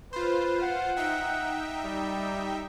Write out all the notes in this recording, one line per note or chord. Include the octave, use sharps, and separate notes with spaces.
F4 B4 C5
F#5
D#4 E5 G5
G3